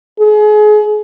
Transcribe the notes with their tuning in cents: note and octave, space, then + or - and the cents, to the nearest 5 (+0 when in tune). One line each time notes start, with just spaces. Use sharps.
G#4 +30